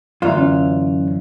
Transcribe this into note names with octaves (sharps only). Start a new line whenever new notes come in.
F#2 D3 E3 A#3 F4
C#4